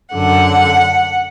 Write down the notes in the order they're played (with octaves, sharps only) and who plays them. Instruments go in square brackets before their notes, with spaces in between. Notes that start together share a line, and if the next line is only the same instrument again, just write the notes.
[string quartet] F#2 D3 F#5